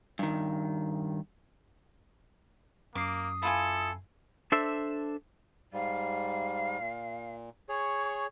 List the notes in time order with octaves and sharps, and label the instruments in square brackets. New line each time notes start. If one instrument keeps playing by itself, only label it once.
[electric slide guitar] G2 D#3
[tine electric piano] F#2 C7 [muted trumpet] A#3 [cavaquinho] D6 [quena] D#6
[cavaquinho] E4 F4 G#5 [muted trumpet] A4
[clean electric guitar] D4 A4 C5 E5
[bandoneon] G#2 G3 [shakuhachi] F5
[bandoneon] A#2
[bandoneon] G#4 C#5 [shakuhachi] C#6